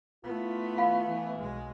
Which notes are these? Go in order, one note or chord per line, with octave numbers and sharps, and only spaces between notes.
A3 B3 E4 F4
F5 B5
E3
B1 G#3